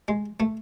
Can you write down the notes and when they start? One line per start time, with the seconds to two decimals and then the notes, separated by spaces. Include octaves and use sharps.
0.08 G#3
0.40 A3